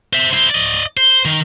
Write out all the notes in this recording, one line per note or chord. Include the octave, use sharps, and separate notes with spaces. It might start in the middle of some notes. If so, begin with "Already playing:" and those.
C5 E5
E4 C5
D5 D#5
C5
D#3